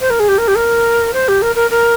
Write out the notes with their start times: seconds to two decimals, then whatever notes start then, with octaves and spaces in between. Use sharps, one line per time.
0.01 C5
0.10 A#4
0.20 G#4
0.28 G4
0.38 A#4
0.48 G4
0.56 A#4
1.13 C5
1.28 G4
1.42 A#4
1.55 A#4
1.71 A#4